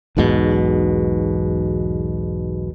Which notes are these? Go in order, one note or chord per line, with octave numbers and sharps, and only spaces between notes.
B1 E2 G#2 B2